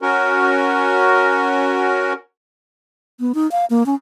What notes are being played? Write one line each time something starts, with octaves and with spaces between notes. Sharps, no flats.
C#4 F#4 A#4
B3
D#4
F5
A#3
C#4